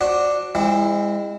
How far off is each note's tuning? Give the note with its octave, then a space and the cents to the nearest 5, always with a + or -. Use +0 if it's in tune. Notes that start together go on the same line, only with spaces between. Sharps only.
D4 +0 F#4 +0 C5 +30
G#3 -35 C4 +0 E4 +0